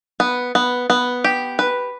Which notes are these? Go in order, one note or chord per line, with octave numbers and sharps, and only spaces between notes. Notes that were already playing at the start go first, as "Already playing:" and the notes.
B3
B3
B3
G4
B4